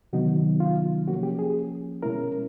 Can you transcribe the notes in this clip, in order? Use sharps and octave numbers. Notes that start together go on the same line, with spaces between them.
C3 D#3 F#3 B3 D#4 F#4
F4
F3 A#3 C#4 F#4
G4
G#4
B2 G#3 C#4 E4 A#4